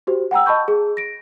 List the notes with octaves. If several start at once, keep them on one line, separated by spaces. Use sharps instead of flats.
F#4 G4 C5
F#5 G5 A#5 E6
D#5 A5 B5 C#6 G6
G#4
A#6 D7